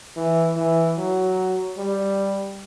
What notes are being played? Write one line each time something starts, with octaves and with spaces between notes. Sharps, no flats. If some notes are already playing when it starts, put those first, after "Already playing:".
E3
E3
F#3
G3